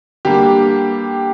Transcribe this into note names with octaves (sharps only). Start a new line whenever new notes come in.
D3 G3 A#3 G4